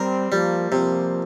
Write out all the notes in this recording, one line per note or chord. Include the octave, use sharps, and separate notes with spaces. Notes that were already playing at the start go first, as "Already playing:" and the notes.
Already playing: G3 C4 A#4
F3 G3 A#3
C3 F3 A#3